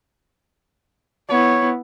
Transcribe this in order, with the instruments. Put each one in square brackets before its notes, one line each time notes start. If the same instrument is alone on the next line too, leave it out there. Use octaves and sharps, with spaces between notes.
[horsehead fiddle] B3 E4 [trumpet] C#5